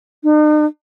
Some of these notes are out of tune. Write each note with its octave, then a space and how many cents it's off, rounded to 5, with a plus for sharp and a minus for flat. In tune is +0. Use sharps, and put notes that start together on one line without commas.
D#4 -45